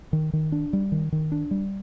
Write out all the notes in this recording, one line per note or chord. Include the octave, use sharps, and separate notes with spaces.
D#3
D#3
D4
G3
D#3
D#3
D4
G3